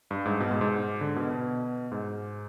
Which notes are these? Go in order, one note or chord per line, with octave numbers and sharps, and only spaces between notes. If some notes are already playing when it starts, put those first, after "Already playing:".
G2
G#2
B2
G#2
G#2
D3
B2
B2
G#2